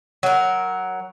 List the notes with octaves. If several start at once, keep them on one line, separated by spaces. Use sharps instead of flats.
F#3 A#4